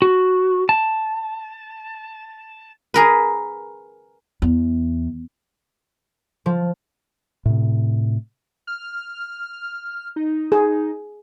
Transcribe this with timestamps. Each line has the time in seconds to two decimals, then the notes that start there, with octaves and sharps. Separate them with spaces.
0.02 F#4
0.69 A5
2.94 G#4 A#4 B4
4.42 E2
6.46 F3
7.46 A2 C3
8.67 F6
10.16 D#4
10.52 G#4